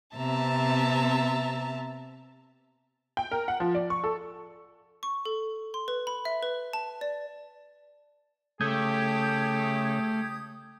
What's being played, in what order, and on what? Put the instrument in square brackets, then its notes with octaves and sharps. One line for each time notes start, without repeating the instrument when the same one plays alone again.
[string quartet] C3 B3 C4 E5 A5 A#5
[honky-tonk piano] G5
A#4
F#5
F3
D5
C#6
A4
[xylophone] C#6
A4
C6
B4
B5
E5
B4
A5
D5
[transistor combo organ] C#3 [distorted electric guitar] A3 [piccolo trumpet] G4 [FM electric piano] D#6 G6 G#6